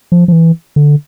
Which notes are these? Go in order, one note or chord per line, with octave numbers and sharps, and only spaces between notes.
F3
F3
E3
D3